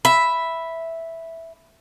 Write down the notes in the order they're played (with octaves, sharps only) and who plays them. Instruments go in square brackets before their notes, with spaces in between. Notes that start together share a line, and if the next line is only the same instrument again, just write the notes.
[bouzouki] E5 [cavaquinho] B5